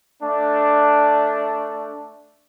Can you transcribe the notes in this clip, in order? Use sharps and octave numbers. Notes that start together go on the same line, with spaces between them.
A3 D4